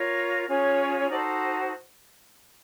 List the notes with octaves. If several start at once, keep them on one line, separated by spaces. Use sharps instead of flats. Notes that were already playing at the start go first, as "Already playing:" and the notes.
Already playing: F4 A#4 C#5
C#4 F4 G#4 C#5
D#4 F#4 A4 C5 D5